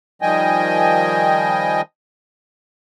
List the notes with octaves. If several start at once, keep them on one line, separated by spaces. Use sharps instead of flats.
D#3 F3 G3 D#5 G5 G#5